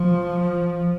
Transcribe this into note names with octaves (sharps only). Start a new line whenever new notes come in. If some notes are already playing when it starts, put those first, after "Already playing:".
Already playing: F3